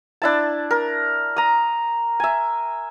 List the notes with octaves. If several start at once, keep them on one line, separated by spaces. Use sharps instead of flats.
D4 E4 A5
A#4
A#5 D#6
E5 G#5